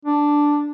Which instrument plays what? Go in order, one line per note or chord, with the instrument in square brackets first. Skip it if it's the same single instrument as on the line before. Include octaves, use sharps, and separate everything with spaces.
[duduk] D4